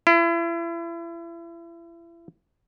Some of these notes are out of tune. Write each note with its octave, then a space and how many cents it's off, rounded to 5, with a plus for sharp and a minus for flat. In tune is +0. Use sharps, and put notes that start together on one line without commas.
E4 +35